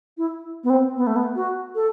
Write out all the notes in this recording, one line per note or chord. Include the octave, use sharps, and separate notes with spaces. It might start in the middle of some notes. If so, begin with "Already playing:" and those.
E4
B3
C4
B3
A3
B3
F#4
A4